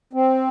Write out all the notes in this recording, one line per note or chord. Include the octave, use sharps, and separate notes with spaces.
C4